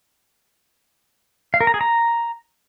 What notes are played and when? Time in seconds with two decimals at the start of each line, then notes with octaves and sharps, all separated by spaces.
1.54 F5
1.61 A#4
1.67 A#5
1.74 G#4
1.81 A#5